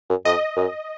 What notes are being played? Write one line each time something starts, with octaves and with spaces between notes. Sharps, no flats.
F#2
F2 D#5
F#2